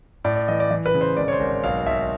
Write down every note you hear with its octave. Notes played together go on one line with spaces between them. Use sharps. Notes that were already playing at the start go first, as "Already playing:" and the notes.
A2 D5
D5
E3 D#5
D5
E3
B4
C#3
C5
G#1 D5
C#5
C5
G#1
B1 F5
B1 E5